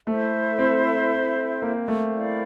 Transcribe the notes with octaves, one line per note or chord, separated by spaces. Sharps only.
A3 E4 A4 C5 E5
C4
A#3
A3
E4 A#4 D5 F5